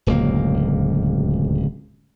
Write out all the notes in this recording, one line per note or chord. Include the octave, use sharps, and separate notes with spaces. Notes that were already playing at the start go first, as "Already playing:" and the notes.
D1 C#2 F#2 A#3